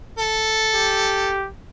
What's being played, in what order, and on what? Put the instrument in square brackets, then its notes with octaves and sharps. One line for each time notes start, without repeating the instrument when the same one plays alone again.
[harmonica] A4
[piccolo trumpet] G4